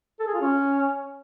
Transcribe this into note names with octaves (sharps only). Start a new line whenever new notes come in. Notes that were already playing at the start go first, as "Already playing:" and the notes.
A4
G#4
F4
C#4